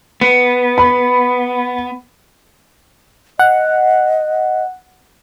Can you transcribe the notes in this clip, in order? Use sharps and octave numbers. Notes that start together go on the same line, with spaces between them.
B3
B5
D#5 F#5